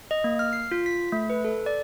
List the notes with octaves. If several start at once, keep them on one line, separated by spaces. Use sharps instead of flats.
D#5
A#3
F6
C7
F4
B6
A3
B4
A4
D5